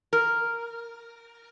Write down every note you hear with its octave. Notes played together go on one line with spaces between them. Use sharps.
A#4